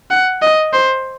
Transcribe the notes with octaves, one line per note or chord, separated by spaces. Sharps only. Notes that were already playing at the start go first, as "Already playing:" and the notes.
F#5
D#5
C5